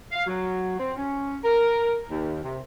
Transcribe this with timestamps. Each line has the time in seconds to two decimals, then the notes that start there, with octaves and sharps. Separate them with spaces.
0.12 F5
0.26 F#3
0.78 C4
0.96 C#4
1.44 A#4
2.08 D#2
2.42 C3